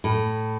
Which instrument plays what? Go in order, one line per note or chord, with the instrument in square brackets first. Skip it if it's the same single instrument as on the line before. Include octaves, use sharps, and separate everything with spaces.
[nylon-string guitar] A2